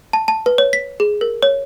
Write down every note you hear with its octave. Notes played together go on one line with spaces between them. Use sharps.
A5
A5
B4
C#5
B6
G#4
A#4
C#5